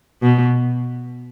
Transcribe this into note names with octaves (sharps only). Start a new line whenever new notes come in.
B2